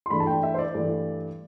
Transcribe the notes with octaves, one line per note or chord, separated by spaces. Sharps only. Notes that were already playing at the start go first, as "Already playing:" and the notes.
C6
G2 E3 A3 D4 B5
A5
G5
E5
C5
D5
G2 E3 A3 D4